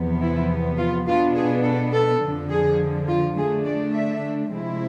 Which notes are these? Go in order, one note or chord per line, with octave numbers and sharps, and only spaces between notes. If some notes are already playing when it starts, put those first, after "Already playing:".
Already playing: E2 C3 F3 B3
E4
F4
B2 B3 D4 F4
G#4
A4
A4
F2 D3 F3
G#4
F4
D3 A3 D4 G#4
D5
E5
C3 F3 G#3 C4 E4